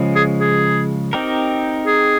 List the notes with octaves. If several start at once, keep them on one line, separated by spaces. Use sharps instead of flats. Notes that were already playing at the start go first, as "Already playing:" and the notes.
Already playing: C#3 F3 G#3
G#4
G#4
C4 D#4 G4 A#4
G#4